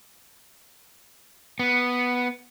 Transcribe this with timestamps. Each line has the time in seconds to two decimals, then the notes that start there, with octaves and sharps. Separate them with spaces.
1.59 B3